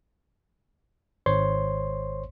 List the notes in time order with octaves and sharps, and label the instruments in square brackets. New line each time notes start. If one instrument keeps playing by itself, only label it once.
[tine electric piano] G#1 C5 C#5 C6